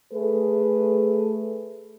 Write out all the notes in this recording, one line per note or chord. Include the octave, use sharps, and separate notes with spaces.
A3 G#4 A4 B4